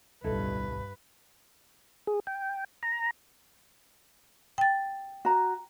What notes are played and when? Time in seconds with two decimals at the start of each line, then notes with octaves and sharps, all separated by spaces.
0.24 D1 B1 G2 E4 A4 B4 D#5
2.07 G#4
2.27 G5
2.83 A#5
4.58 G5 A6
5.25 F#4 A#5